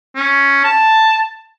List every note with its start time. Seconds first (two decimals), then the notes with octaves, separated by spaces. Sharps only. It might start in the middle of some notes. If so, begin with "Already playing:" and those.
0.16 C#4
0.64 A5